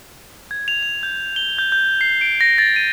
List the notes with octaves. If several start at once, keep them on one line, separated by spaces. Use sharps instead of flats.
G#6
F7
F7
G6
G7
G6
G6
C7
D7
A#6
A6
D#7